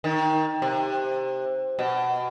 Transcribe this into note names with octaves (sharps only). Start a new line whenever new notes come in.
D#3
C3
B2